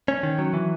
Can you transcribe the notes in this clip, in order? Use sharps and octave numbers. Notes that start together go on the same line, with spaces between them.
C#4
D#3
F#3
E3